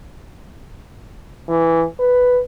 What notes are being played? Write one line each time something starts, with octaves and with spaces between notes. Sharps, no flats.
E3
B4